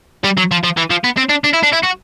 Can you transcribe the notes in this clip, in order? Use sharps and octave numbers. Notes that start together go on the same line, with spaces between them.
G3
F#3
F3
F3
E3
F3
B3
C4
D4
D4
E4
D4
E4
F#4